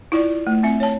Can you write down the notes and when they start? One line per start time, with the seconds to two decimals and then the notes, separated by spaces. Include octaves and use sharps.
0.12 E4 F4 D5
0.47 A3
0.63 C4 E5
0.80 C#5 A5